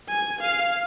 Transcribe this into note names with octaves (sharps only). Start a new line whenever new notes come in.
G#5
F5